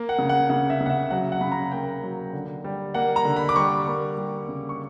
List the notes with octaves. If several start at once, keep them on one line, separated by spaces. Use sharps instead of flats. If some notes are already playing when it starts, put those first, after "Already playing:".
Already playing: A#3
F#5
C#3
F#5
C#3 F#5
E5
C#3
F#5
E5
F#3 F#5
F#5
C#3 B5
A#5
A#3 G5
F#3
D3
G3
A#3 F#5
A#5
D3
B5
D6
G3 C#6
A#3
G3
C#3
C#6